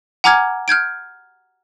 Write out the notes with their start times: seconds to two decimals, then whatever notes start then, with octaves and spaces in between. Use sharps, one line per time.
0.24 F#5 G#5 A#5 D6 F6 G#6
0.68 F6 G6 G#6 D7